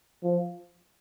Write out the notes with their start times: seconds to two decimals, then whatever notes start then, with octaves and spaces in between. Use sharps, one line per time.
0.23 F3